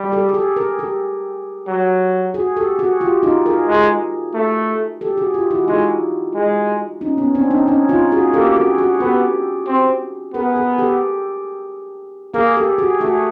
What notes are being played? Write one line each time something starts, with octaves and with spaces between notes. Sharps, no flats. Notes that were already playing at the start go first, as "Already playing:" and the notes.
Already playing: G3
G4 A4
G#4
G4 A4
G#4 A#4
G4 A4
F#3
F#4 G#4
G4 A4
F#4 G#4
F4 G4
D#4 F4
G#4 A#4
G#3
A3
G4 A4
F#4 G#4
F4 G4
E4 F#4
G#3 D#4 F4
G#3
C#4 D#4
B3 C#4
C4 D4
C#4 D#4
C#4 D#4
D#4 F4
F#4 G#4
A#3 G4 A4
F#4 G#4
F#4 G#4
B3 G4 A4
C4
B3 G#4 A#4
G#4 A#4
G4 A4
A#3 G#4 A#4
G4 A4
F#4 G#4
A3 F#4 G#4